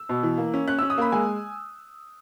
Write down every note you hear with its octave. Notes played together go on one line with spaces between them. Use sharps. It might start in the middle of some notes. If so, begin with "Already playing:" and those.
Already playing: E6
B2
E3
A#3
C#4
C#4 F#6
C#4 E6
D#6
A#3 B5
G#3 G#5